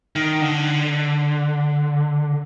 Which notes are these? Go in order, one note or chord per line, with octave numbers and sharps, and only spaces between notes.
D#3
D3